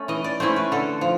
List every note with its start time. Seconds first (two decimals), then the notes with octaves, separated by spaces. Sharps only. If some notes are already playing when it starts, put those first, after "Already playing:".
Already playing: A3 C#4
0.08 E3 D#5
0.24 D5
0.40 A3 C#4 E4 C5
0.56 B4
0.72 D3 A4
1.01 F3